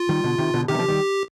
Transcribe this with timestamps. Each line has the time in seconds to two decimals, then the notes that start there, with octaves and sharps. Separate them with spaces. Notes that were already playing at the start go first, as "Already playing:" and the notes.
Already playing: F4
0.09 D#3 G3
0.24 B2 D3
0.38 C3 D#3
0.54 B2 D3
0.68 C3 D#3 G4
0.74 G3
0.78 D3 F3
0.88 D#3 G3